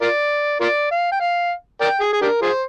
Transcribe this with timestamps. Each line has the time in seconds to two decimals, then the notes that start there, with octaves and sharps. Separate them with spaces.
0.01 F4 A#4 D5
0.61 F4 A#4 D5
0.91 F5
1.12 G5
1.20 F5
1.81 A#4 D5 G5
2.00 G#4
2.13 G#4
2.22 D4 G4 A#4
2.42 F4 G#4 C5